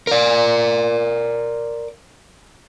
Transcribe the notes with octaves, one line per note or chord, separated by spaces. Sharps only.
A#4 D5